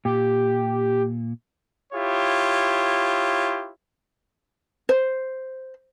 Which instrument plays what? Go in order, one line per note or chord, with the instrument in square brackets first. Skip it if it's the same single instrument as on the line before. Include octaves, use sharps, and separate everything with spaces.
[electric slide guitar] A#2 [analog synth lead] G4
[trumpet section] E4 F4 G4 C#5
[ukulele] C5